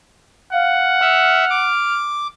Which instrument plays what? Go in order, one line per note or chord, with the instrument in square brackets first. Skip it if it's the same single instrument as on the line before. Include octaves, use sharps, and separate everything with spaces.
[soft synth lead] F5 [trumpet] F#5
[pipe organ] E5 [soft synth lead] F6
[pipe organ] D6